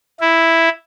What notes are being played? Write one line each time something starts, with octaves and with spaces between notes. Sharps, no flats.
E4